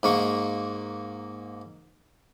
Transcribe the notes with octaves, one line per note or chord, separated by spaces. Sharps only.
G#2 A#3 C#6